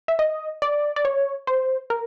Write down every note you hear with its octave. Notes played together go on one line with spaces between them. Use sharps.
E5
D#5
D5
D5
C#5
C5
A#4